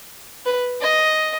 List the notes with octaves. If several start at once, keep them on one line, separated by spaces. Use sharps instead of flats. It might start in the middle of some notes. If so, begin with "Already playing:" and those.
B4
D#5